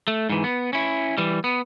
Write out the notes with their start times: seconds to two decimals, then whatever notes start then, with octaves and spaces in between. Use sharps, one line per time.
0.08 A3
0.29 G#2 E3
0.44 B3
0.73 C#4 E4
1.18 E3 G3
1.44 B3